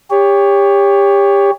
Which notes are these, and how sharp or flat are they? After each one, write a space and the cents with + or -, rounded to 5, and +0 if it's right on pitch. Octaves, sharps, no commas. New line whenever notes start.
G4 +30 C#5 +15